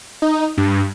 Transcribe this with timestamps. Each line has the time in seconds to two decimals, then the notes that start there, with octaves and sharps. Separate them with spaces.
0.22 D#4
0.57 G2